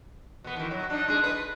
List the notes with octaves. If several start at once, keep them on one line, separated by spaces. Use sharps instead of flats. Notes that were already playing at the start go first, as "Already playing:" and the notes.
B2 B3
D#3 E3
F#3
D4 D#4
G#3 D4 G#4
B4